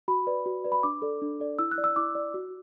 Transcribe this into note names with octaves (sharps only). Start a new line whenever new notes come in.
F#4 B5
B4 D5
F#4
B4 D5
B5
D4 D6
A4 D5
D4
A4 D5
E4 E6
F#6
D5
E6
E4 D6
D5
F#4